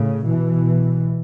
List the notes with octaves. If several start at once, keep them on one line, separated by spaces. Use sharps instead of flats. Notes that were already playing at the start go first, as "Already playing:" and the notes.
Already playing: A2 C#3
B2 E3